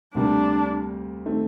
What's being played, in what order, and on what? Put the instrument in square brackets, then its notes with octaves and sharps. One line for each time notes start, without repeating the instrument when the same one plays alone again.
[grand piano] D2 C3 G3 A#3 [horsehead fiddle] D4
[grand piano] D#3 A3 C4